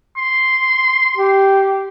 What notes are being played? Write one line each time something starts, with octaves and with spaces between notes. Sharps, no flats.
C6
G4